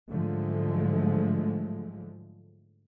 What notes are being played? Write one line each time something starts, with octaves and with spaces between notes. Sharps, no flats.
G#2 D3 F3 F#3 G#3 A3